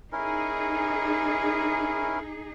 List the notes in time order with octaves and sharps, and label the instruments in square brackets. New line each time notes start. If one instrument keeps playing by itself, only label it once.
[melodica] C#4 E4 A#4 [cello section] D#4 G#4